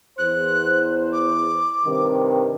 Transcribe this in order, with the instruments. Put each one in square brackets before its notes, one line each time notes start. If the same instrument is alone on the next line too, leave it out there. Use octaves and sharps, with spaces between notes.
[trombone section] E2 C5 [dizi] F#6
[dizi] D6
[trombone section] G2 C3 D#3